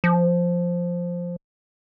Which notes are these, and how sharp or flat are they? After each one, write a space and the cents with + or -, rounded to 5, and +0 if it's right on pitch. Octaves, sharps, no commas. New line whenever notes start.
F3 +0